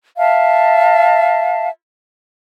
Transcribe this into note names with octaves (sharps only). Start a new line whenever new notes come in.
E5 F5 A5